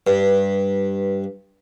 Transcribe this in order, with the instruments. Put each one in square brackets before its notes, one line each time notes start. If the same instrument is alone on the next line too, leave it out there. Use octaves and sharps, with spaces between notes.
[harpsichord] G2 [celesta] B4